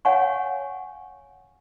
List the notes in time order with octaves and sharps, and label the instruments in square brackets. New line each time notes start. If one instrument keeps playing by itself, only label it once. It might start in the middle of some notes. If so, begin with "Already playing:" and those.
[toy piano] C#5 F5 F#5 G#5 C#6